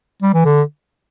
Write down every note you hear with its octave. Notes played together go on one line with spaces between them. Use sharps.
G3
E3
D3